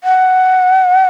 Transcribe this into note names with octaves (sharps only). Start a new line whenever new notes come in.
F#5